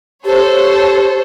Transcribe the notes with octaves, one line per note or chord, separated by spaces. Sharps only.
G4 A4 C5 C#5